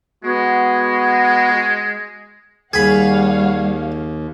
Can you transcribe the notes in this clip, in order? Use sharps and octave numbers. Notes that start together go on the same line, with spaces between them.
G#3 B3 F#4
D#2 G3 G#4 C#5 F5 F#5 B5